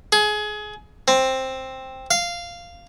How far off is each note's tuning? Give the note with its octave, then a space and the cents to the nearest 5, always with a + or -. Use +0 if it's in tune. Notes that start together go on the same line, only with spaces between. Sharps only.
G#4 +25
C4 +10
F5 -10